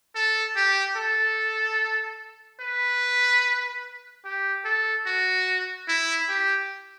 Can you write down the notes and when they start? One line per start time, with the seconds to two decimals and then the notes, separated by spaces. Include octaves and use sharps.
0.15 A4
0.56 G4
0.96 A4
2.61 B4
4.25 G4
4.65 A4
5.06 F#4
5.88 E4
6.29 G4